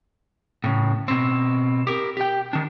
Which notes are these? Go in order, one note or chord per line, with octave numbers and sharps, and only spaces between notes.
A2 C#3
B2 C4
G4 A#4
G4 G5
D#3 D4